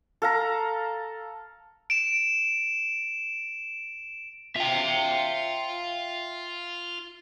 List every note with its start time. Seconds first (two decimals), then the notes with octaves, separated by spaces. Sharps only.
0.22 A4 F5 A#5
1.90 D7 E7
4.56 F4 E5 G5